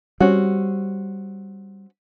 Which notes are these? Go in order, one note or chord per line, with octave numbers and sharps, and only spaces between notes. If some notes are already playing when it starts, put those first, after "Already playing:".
G3 C4 C#4 F#4